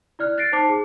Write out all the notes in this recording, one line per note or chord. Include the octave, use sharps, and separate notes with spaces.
E4 D5 F6 F#6
F#6 A6 A#6 C7 D7
D#4 C5 A5 D6 C7
G#4